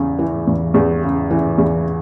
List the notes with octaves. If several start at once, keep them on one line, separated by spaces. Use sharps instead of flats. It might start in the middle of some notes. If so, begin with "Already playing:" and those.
Already playing: E2 C#3
E3
E2
E2
C#3
E3
E2